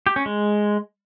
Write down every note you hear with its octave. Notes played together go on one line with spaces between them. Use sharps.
G4
C#4
G#3